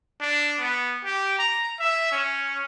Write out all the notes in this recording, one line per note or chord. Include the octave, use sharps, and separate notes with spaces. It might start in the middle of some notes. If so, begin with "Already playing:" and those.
D4
B3
G4
A#5
E5
C#4